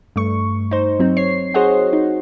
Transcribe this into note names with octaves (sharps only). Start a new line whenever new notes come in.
G2 A3 C#6
D#4 C5
F#3 C4 D#4
C#5 C7
F#4 G#4 C5 C#5 D#5 F#5
D#4